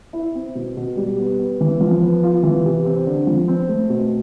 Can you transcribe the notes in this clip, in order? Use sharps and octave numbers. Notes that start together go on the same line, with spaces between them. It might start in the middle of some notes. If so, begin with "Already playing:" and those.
E4
C4
B2
B2
G3
B3
B3
E3
F3
B3
F4
E3
C3
C4
D3
F3
C4
A3
B2